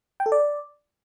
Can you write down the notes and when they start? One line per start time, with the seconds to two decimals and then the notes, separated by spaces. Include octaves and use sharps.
0.20 G5
0.26 A4
0.32 D5